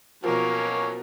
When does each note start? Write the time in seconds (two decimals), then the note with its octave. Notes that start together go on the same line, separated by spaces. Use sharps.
0.24 B2 F3 F#3 A#3 C#4 A#4